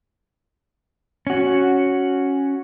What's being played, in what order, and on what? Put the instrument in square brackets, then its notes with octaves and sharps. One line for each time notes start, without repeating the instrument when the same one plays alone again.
[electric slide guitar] C#4 F#4